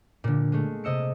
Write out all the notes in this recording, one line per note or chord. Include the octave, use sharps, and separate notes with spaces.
A#2 D3
G#3 A3
C3 D#5 E6 C#7